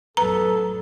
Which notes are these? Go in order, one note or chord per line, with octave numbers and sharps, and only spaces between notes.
A1 F#2 F#3 B3 A4 A#5